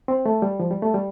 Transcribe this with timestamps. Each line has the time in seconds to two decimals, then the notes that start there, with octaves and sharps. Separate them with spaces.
0.08 C4
0.26 A3
0.42 G3
0.60 F3
0.71 G3
0.83 A3
0.94 G3